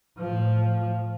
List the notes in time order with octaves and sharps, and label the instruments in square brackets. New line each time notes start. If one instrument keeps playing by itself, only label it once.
[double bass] A2 F3